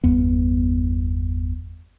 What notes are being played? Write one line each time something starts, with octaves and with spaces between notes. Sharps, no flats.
G1 E2 B3